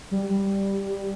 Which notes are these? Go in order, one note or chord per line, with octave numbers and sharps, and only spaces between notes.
G3